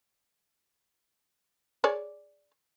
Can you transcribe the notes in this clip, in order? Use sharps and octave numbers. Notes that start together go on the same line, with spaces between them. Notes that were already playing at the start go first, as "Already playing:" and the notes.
G#4 C#5 D5